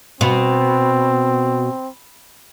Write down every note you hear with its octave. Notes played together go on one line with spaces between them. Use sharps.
B2 C4